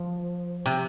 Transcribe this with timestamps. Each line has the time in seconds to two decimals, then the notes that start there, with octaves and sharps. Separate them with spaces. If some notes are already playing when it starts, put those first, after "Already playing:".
Already playing: F3
0.66 C3